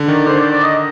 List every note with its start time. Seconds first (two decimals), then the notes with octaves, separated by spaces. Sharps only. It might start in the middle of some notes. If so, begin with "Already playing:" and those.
Already playing: D3
0.08 D#3 D5
0.27 D3 C5
0.39 D5
0.51 D5
0.63 D#5